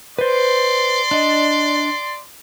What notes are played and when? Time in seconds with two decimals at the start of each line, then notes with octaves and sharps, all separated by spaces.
0.19 B4 C5 D5 C6
1.11 D4 D#5